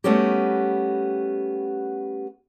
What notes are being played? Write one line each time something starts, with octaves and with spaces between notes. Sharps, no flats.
G3 A3 B3 C#4 F#4 G4